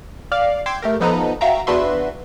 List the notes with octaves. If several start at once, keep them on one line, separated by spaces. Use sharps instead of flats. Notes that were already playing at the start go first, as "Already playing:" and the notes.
D5 F5
G5 C6 D6 E6 G#6
A3 G4 A#4
F3 B3 D#4 A4 B4 A#5
F#4 E5 F5 G5 A#5
E2 D4 F#4 B4 E5 C6